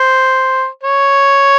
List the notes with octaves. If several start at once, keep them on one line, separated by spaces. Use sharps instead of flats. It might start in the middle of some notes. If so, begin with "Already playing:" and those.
Already playing: C5
C#5